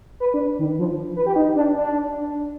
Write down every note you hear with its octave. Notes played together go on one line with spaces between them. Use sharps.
B4
D4
D#3
F3
B4
G4
D#4
D4
D4